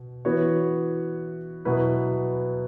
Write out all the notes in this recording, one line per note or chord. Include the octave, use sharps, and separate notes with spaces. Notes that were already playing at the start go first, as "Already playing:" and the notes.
Already playing: B2
E3 B3 F#4 C#5
B2 F#3 B3 E4 B4